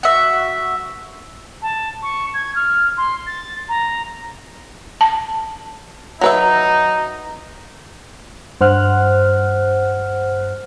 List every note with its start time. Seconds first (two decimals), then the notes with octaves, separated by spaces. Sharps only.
0.03 F#4 E5
1.62 A5
2.03 C#6
2.34 G#6
2.55 F6
2.97 C6
3.27 A6
3.69 A#5
5.01 A5
6.21 F#3 D#4 B4 E5
8.61 G2 C5 F#5 F6 F#6